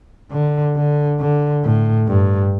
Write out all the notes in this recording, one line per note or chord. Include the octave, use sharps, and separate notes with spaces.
D3
D3
D3
A2
G2